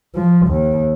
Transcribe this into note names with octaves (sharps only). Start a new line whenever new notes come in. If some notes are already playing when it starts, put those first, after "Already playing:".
F3
D#2